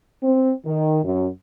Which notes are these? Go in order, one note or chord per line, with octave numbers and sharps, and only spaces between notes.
C4
D#3
F#2